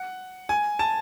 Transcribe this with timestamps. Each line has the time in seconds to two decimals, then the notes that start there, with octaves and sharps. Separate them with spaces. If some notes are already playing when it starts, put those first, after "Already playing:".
Already playing: F#5
0.49 G#5
0.79 A5